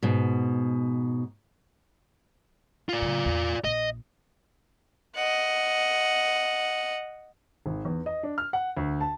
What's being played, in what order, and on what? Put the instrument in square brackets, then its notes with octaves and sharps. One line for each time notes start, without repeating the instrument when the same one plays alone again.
[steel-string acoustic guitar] G#2 B2
[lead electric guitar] F4 D5
[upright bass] C#3 F#3
E2
[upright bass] A#1 [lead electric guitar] D#5
[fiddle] D#5 F#5
[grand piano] G#1
E2
D#5
D4
F6
F#5
D2
A5